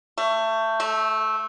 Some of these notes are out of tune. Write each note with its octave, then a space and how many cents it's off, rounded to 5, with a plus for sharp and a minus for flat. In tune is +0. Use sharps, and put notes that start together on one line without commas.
A3 +20
A3 -15